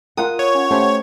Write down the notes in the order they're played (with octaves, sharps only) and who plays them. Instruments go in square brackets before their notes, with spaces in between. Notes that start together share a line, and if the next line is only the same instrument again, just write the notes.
[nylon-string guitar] F4 A#4 [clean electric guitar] F#5 [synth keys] D#6
[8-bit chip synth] C#5
[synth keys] C#4
[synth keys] A3 C#4 G4 [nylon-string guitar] C5